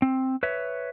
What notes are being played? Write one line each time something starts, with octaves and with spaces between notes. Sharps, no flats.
C4
B4 C#5 E5